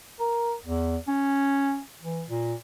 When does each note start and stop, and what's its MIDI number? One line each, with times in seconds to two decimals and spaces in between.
0.19 0.53 70
0.65 0.97 40
1.07 1.80 61
2.01 2.23 52
2.28 2.53 46